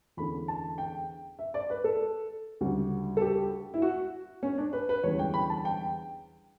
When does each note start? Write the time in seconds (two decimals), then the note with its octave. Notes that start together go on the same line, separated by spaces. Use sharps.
0.17 E2 D3 A3 C#4 B5
0.48 A5
0.78 G5
1.39 E5
1.54 D5
1.70 B4
1.84 A4
2.61 D2 C#3 G3
3.17 A4
3.21 G4
3.74 E4
3.82 F#4
4.43 C#4
4.58 D4
4.73 B4
4.89 B4
5.03 E2 D3 G3 C#4 C#5
5.19 G5
5.34 B5
5.50 A5
5.65 G5